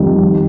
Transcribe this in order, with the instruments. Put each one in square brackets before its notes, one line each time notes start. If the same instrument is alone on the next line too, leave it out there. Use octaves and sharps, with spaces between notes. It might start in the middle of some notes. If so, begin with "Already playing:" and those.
Already playing: [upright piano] F2 D#3 G3